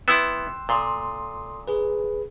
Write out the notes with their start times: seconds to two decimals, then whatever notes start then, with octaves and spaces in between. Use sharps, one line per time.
0.08 B3 E4 G5 C6 E6 F#6 E7
0.69 A#2 A4 C6 D#6
1.68 G#4 B4